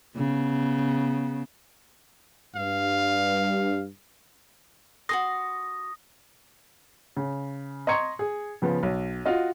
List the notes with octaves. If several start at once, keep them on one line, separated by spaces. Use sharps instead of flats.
C#3 B3
G2 F5
F#4 G#4 C6 D#6 A#6
C#3
D#5 A#5 C6 C#6 G#6 C#7
G#4
C#3 F3 B3
B1
F4 F#4 D#5